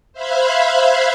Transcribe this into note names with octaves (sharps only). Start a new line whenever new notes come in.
C5 E5 F5 B5 F#6 G#6